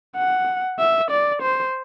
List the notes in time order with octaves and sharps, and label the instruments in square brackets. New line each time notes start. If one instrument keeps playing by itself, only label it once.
[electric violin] F#5
E5
D5
C5